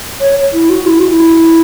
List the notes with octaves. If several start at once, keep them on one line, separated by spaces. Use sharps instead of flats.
C#5
E4
F#4
E4
F#4
E4